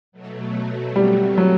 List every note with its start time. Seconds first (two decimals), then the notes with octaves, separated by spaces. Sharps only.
0.12 B2 F#3 A3
0.96 G3
1.38 F#3